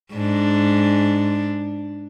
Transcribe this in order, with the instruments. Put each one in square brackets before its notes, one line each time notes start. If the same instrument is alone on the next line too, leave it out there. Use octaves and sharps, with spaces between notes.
[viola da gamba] G#2 D4